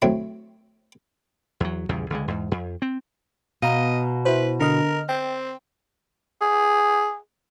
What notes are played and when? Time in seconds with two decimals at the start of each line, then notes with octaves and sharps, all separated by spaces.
0.02 F#3 A3 C4 E4
1.60 E2 F#3
1.89 A#1 E2 C#3 G3
2.10 C#2 D3 G#3
2.28 E2 G#2
2.51 F2
2.82 C4
3.62 B2 D#5 F5 A#5
4.25 E4 F#4 B4 C5
4.60 D3 A#4 D#5 F6
5.09 C4 G5
6.41 G#4